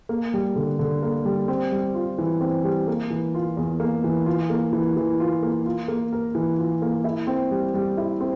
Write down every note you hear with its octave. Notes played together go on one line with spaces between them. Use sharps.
A#3
G3
D3
D3
A#3
G3
C4
G3
F4
E3
C4
G3
A#3
E3
F4
E2
A#3
E3
F4
A#3
E3
E3
F4
A#3
F4
A#3
A#4
E3
F4
A#3
E4
C4
G3
G3
E4
C4